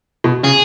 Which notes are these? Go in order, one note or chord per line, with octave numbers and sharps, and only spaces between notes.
B2
C#3 G#4